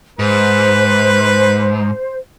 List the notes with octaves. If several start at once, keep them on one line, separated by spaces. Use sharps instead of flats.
G#2 B4 C5